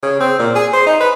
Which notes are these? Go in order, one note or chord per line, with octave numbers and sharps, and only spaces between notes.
C#3
C4
A#2
G#4
C5
D#4
B4